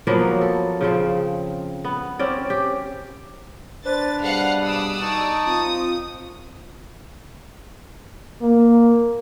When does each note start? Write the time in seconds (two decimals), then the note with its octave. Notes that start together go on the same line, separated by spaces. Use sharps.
0.07 F3 F#3 A#3 B3
0.41 A4
0.81 C#3 F3 C4
1.85 B3
2.19 C4 C#4 D5
2.50 G4
3.85 D4 B4 C5 A6
4.21 B2 G3 G#4 F5 F#5
4.64 D5 D#6 E6
5.01 D#4 A5 C#6
5.46 C4 F4 D#6
8.42 A#3